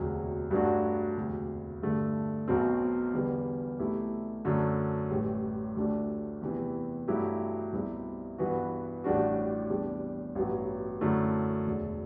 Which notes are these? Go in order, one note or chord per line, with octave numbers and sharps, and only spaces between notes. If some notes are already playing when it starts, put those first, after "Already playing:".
Already playing: E1 D2 C3 F#3
G2 F#3 A3 D4 F#4
E1 D2 C3
G2 D3 A3
B1 B2 F#3 C4
E2 D3 G3 B3
C2 B2 A3 E4 G4
F#2 D3 A3
A1 A2 E3 G3
D2 D3 A3 D4 G4
E2 C3 E3
G2 F#3 A3 E4 G4
C2 B2 G3 C4 E4
G2 E3 B3 F#4
A1 A2 G3 D4 F#4
E2 C3 G3 D4
A1 G2 F#3 B3
F#2 D3 A3 E4
E1 D2 D3